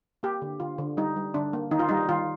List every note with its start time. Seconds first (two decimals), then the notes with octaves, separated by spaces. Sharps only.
0.23 A#3 G4
0.42 D3
0.60 D3 F4
0.78 D3
0.97 G3 D#4
1.16 G3
1.34 D3 D4
1.53 A#3
1.71 D#3 D#4
1.79 F4
1.89 G3 D#4
2.09 D#3 F4